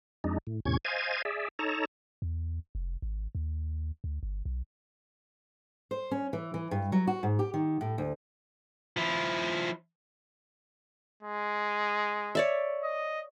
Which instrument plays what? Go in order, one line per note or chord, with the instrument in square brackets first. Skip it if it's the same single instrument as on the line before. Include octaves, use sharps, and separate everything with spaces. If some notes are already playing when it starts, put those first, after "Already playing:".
[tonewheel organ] F2 G#3 D4 D#4
A2
E2 A2 C3 C#4 C#6 G#6
C5 D#5 F5 G#5 G#6 A6
G#4 D5 E5
D#4 A4 C#5 A5 A#5
[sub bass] E2
F1
G#1
D#2
D2
G1
B1
[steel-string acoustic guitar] C5
C#4
E3
E3
G2
F#3
F#4
G#2
G4
D#3
A2
D2
[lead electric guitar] F3 E4
[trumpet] G#3
[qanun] C#5 D5 E5
[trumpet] D#5